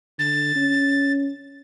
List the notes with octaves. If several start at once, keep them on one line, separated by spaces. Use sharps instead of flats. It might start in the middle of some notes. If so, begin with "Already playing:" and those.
D3 A6
C#4